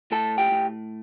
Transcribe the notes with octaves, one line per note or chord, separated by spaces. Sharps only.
A2 A4 A5
G4 G5
A2